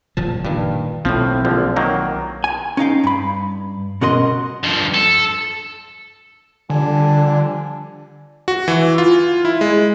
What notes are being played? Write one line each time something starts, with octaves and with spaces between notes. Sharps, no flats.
F#1 A#2 F3 A5
G2 A#2 D#3
B1 A2 F3 C4
A#1 D3 F3
D#3 F#3 A#3
G#5
C#4 D#4 F5 G5
G2 B5
B2 C#4 F#4 A#4 D#5 C6
G2 F3
A4
D3 F3 G3 D4 G#5 A5
F#4
E3
F4
E4
G#3